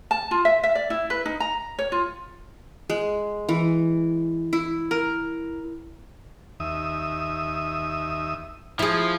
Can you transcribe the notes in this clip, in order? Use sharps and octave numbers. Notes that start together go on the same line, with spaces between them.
A5
F4
E5
E5
D5
E4
B4
D#4
A#5
C#5
F4
G#3
E3
E4
A#4
D#2 E5 D#6
F3 E4 G#4